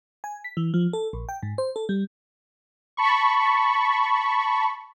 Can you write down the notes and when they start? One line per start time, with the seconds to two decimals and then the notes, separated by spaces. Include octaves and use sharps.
0.24 G#5
0.44 B6
0.57 E3
0.74 F3
0.93 A4
1.13 A#1
1.29 G5
1.43 G#2
1.58 C5
1.76 A4
1.89 G3
2.97 A5 B5 C#6